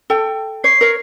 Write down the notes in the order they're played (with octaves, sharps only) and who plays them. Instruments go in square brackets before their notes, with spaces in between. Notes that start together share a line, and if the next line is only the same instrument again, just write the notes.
[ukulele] A4 G5
[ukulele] C#5 [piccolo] C7
[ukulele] A#4 C#5